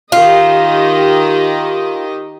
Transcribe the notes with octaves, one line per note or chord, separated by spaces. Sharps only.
D#3 F4 G4 D#5